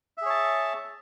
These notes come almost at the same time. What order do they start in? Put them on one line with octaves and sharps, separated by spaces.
E5 G#4 C#5 A5